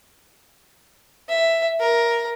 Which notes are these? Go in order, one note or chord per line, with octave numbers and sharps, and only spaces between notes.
E5
A#4